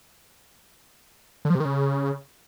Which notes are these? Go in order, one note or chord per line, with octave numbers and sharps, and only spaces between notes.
D3
F3
C3
D#3
C#3